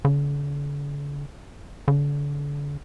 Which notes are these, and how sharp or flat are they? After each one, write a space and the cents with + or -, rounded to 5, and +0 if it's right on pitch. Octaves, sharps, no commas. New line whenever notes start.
D3 -45
D3 -35